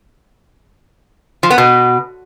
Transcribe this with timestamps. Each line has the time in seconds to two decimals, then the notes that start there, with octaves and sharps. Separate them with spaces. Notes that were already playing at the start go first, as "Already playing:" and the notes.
1.43 F3
1.50 B3
1.58 B2